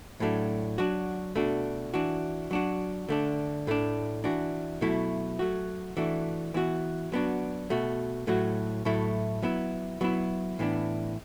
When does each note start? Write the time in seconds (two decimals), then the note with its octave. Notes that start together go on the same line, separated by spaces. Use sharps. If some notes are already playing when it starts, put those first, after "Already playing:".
0.20 A2 F#3 A3 D4
0.78 F#3 D4 F#4
1.35 B2 A3 D4 F#4
1.94 E3 D4 F#4
2.51 F#3 D4 F#4
3.09 D3 A3 D4
3.67 A2 A3 D4
4.24 E3 D4 F#4
4.81 B2 F#3 A3 E4
5.39 F#3 A3 F#4
5.97 E3 A3 D4 F#4
6.54 E3 B3 F#4
7.12 F#3 B3 D4 F#4
7.70 B2 A3 F#4
8.27 A2 F#3 A3 F#4
8.85 A2 F#3 A3 E4
9.43 F#3 B3 E4
10.01 F#3 B3 E4
10.59 A2 E3 B3 D4